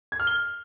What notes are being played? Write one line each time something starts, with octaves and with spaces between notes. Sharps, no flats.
G#6
F6
G7